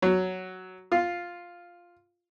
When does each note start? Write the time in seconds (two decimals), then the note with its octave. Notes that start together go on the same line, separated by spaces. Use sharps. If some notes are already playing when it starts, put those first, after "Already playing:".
0.02 F#3
0.92 F4